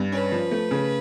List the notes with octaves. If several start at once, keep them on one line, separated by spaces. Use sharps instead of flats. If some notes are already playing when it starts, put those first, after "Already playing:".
Already playing: G2
C#4 B4
F3
A3
C#3